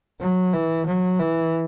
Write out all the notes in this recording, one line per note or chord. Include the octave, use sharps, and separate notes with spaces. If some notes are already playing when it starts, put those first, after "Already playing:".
F#3
E3
F#3
E3